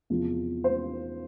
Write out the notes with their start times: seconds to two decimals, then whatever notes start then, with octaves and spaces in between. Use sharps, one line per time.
0.10 E2 C3 F3
0.64 C5